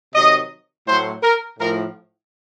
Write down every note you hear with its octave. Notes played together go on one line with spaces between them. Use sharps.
C3 D#3 F#3 D#5
A2 F#3 C5
A#4
A2 F3 A#4